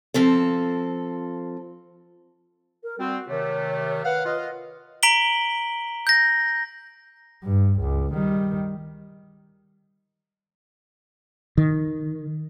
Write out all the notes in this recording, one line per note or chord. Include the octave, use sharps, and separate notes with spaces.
F3 C4 A4
A#4
G3 C4 F#4
C3 D#3 A3 C#5
B4 F5 F#5
F4 D#5 F5
A#5 B6 D7 F#7 G7
G6 A#6
G2
C#2
D#3 G3
D#3